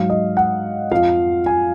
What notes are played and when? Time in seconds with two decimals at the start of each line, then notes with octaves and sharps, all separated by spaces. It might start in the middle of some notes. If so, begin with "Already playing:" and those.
Already playing: G#2 F#3 F5
0.10 D#5
0.37 F#5
0.91 F2 F3 F5
1.46 G#5